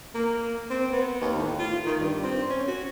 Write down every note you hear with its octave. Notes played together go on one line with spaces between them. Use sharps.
A#3
C4
B3
D#2
A2
F4
D#3
G2
C4
C#4
F#4